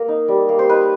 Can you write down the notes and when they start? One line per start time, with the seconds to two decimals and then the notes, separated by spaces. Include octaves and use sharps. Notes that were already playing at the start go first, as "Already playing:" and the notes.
Already playing: A#3 A#4
0.08 D#4
0.28 G3
0.49 A#3
0.59 C5
0.69 D#4 B4